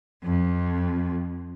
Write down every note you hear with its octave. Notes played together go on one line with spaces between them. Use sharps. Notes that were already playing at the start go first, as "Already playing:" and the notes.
F2